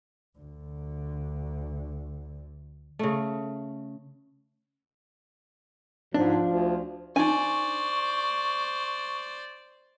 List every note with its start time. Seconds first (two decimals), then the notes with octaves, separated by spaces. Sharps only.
0.39 D2 D3
2.99 C#3 A3
6.14 G#2 F3 D4
6.46 D2
7.16 D4 D#4 C5 D5 G#5 C#6